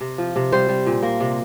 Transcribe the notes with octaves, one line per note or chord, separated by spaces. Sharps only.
C3
F3
C3
G3 C5
G3
A#2
A#3
C3